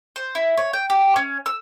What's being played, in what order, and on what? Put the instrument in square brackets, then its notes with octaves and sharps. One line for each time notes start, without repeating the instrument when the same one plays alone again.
[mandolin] C5
E4
C#5
G5
G4
C#4
E6